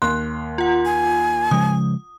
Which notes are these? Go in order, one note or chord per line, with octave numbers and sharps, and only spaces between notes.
D#2 C6 F#6
F4 F#5
G#5
C#3 F3 G#3 D#6